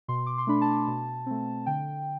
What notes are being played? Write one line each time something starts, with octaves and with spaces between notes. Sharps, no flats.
B2 C6
D6
C6
A3 D4 B5
A5
B2
A3 C4
D3 G5